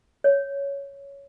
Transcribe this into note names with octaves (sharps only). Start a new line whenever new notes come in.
C#5